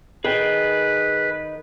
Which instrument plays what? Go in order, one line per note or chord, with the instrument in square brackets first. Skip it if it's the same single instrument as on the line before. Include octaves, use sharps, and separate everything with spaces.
[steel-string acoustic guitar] D#3 [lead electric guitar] G#4 G5 [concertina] B4